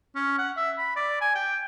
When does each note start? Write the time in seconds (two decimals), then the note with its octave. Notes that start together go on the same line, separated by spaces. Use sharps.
0.15 C#4
0.38 F#5
0.57 E5
0.78 B5
0.96 D5
1.21 G#5
1.35 G5